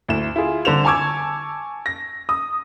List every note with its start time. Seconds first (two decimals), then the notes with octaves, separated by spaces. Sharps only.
0.08 D2 E4 E7
0.36 E4 F4 G#4
0.65 C2 D3 C5 E7 F7
0.85 G#5 A5 C#6 D6 E6 G#6
1.86 A#6
2.29 D#6